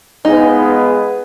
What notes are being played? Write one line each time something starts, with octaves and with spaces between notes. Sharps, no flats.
G#3 B3 D#4 F4 G#4 B4